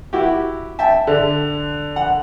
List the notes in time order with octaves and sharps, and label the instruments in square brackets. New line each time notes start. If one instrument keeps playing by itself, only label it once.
[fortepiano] E4 F#4 G4
E5 G5 A5
[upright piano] D3
[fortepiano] F#5